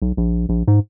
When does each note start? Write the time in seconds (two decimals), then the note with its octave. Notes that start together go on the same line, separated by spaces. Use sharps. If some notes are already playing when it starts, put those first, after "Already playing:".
0.02 B1
0.17 A#1
0.49 A#1
0.68 G#2